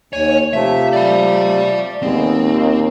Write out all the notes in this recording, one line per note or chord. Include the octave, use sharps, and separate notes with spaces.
D#2 C#5 G#5
C3 F3 A3 E5
D5 B5
D#2 G#3 B3 C4
A#2